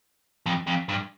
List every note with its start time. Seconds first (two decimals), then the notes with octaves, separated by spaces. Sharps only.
0.46 F2
0.67 F2
0.89 G2